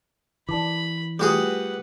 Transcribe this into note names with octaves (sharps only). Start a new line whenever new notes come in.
E3 D5 A5 B5 D6
G3 A3 F4 F#4 G#4 B4 F#5